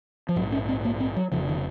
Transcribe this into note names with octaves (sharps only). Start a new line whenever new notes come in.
F3
A#1 G#2 F#3
C#4
C4
A#3
C4
F#3
F1 D#2 C#3 F3
D#3